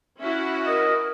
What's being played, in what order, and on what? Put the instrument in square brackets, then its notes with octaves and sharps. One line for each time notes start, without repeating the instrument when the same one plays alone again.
[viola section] C#4 E4 F#4 [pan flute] E5
[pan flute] A#4 [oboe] D#5